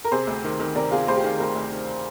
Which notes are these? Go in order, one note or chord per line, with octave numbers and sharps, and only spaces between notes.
A#4
C3 G#4 C5
D2
D#3
D#3
C3 A#4 D5
C3 F4 G#4
D2 G#4 C5
G4
D#3 F4 G#4
D2 G4 A#4
D2
D#3